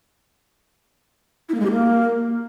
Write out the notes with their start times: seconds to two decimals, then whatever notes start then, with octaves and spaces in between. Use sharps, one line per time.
1.49 E4
1.54 A#3
1.60 G#3
1.65 G4
1.71 A#3